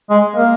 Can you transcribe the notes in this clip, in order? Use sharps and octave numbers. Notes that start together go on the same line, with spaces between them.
G#3
A#3